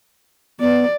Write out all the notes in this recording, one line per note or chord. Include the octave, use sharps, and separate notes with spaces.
B3 D5